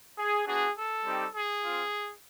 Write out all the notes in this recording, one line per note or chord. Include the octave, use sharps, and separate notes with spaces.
G#4
B3 D4 F#4 G#4
A4
G3 C4 D#4 G4
G#4
C4 F4